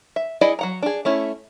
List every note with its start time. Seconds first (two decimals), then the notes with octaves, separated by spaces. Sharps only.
0.16 E5
0.41 E4 G#4 D5 D#5 F#5
0.59 F#3 F#5 A#5
0.82 D4 G#4
1.05 A3 C#4 E4